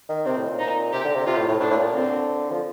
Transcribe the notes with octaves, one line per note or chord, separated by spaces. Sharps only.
D#3
C3 C4
A2
A#2
D#4
C3 G4
D3
C3
C3 F4
A2
A2
A2 D4
A2
A#2
D3 C4
F3